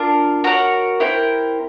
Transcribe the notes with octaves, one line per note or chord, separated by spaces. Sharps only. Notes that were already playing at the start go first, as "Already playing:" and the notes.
Already playing: D4 F4 A#4
F#4 A#4 C#5 F#5
C4 E4 G4 A#4